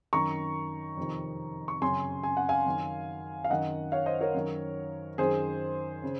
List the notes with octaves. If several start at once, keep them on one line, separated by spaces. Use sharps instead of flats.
F#2 D#3 A#5 C#6
F2 C3 D#3
C#6
F#2 C#3 G#5 C6
G#5
F#5
F5 G#5
F#2 D#3
F5
F#2 D#3 D#5 F#5
C#5 F5
C5 D#5
A#4 C#5
F#2 D#3
F#2 D#3 G#4 C5
C#3